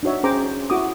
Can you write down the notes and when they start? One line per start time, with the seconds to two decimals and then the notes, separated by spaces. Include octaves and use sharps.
0.03 D4 D#4 F#4 C#5 E5
0.23 C#4 G#4 C5 G5 A#5 D6
0.70 E4 F#4 A4 D6 D#6